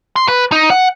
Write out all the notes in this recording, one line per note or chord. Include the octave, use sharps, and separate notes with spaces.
C6
B4
D#4
F#5